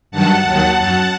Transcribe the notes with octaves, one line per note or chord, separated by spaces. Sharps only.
G2 D#3 F#3 F#5 A5
D#2 D#3 F#3 F#5 A5
F#2 F#3 F#5 A5